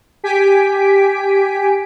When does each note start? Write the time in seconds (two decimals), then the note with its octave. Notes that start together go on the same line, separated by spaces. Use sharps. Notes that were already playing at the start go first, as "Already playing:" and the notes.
0.24 G4 G#5 B6 D7